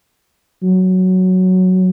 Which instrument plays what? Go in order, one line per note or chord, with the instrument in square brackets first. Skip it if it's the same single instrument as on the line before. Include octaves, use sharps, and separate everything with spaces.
[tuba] F#3